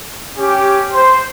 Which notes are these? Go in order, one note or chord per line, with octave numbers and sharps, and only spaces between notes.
C#4 G4
C5